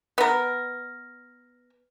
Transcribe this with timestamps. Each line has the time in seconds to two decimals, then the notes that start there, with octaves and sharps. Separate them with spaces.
0.18 B3 A#4